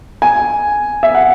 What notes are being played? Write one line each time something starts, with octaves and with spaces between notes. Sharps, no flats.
G#5
E5
F#5